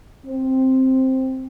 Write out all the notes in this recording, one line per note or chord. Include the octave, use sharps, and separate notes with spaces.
C4